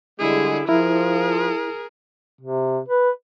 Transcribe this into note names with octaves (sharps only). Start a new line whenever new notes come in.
D3 G3 G#3 E4 G#4
F3 E4 G#4 A#4
C3
B4